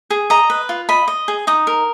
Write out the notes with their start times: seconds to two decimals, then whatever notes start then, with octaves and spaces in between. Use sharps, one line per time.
0.10 G#4
0.30 D#5 A#5
0.50 B4
0.69 F4
0.89 D#5 B5
1.08 D#5
1.28 G#4
1.47 D#4 D#6
1.67 A#4